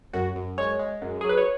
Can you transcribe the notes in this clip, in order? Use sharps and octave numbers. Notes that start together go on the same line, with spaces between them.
F#2 F#4
F#2
G#3 C#5
G#3
F#2
F#3 G#4
B4
C#5